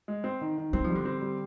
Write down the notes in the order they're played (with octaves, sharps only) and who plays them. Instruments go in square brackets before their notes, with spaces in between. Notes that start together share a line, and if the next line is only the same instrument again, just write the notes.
[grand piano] G#3
C4
D#3
D#3
[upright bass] G#3 [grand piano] C4
[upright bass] F3
[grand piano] G3
[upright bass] D3
[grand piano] C4
G3